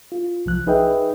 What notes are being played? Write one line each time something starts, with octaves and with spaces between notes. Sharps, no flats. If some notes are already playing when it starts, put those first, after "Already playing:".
F4
C2 F3 F#6
D#4 G#4 B4 D#5 E5 G5